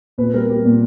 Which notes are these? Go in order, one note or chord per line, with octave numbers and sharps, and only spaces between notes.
A#2 B4
G3 A#4
G3 G4
A#2 A#3